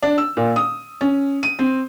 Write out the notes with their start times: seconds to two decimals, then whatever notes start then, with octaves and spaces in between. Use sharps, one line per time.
0.03 D4
0.18 E6
0.37 A#2
0.56 D#6
1.01 C#4
1.43 D#7
1.59 C4